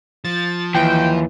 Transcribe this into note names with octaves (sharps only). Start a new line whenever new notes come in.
F3 A6
D#2 E3 G5